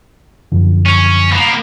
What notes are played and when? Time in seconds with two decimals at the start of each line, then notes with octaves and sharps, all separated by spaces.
0.52 F#2 D3 F3
0.86 C#4
1.32 A#3 B3